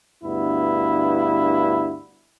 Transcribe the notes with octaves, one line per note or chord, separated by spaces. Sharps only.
D2 G2 B3 E4